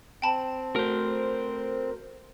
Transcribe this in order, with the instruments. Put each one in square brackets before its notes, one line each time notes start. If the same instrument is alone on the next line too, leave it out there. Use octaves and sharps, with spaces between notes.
[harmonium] C4 [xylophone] G5 A5 B5
[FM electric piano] A3 F#4 A4 [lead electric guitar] A#4 C5